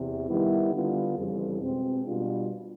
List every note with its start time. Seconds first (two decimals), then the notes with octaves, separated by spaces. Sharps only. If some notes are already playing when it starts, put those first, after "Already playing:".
Already playing: E2 C3
0.28 D#3 G3 B3 E4
0.72 D3 G3 B3 D4 F4
1.17 F2 C#3 E3 G3
1.61 B2 G#3 C4
2.06 B2 G3 B3 D4 F4